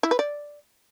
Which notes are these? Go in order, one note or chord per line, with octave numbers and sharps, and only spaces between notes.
E4
B4
D5